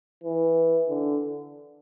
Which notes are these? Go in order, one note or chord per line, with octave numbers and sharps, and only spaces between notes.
E3
D3